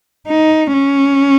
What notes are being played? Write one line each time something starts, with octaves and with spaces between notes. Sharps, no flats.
D#4
C#4